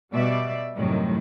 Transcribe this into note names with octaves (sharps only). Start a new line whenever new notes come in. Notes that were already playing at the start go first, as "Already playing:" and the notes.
B2 G3 D5 E5
F#2 A2 C3 D#3 F#3 G3